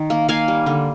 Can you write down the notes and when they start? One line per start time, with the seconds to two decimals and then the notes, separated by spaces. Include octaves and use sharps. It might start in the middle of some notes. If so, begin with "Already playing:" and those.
Already playing: D#3
0.10 A#3
0.28 A#3 F5 G#5
0.48 G3
0.66 D3